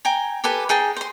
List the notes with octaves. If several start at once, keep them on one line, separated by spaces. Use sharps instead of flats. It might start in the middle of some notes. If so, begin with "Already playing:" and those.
G5 G#5 A#5
G4 A4 B4 G#5
D#4 G#4 G5 A5
C5 C6